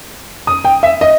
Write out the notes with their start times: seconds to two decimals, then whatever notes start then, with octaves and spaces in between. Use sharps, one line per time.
0.47 D#6
0.65 G5
0.83 E5
1.01 D#5